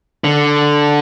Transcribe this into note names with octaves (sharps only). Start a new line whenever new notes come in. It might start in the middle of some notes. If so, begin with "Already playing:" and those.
D3